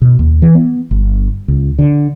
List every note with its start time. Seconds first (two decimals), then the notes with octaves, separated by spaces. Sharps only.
0.02 B2
0.19 D#2
0.42 E3
0.55 B3
0.91 G1
1.48 C#2
1.79 D3